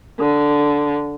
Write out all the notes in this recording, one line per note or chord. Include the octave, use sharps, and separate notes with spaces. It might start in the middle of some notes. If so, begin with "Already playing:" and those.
D3